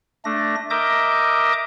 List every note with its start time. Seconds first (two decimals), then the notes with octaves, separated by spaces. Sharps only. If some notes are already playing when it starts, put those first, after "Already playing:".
0.25 A3 D4 A#6
0.70 A#4 D#5 E5 D6 D#6 G6